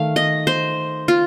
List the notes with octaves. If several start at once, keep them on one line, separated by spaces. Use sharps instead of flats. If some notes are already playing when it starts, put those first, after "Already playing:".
Already playing: D#3 A3 F5
D#5
C5
F4